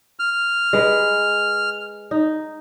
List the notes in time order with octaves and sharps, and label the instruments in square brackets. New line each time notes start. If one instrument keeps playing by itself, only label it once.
[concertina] F6
[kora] G#3 B4
D#4